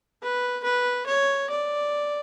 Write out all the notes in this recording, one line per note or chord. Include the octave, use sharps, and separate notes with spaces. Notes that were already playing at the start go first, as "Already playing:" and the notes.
B4
B4
C#5
D5